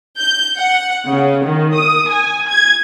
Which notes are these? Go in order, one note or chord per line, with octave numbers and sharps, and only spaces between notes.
G6
F#5
C#3
D#3
D#6
G#5
G#6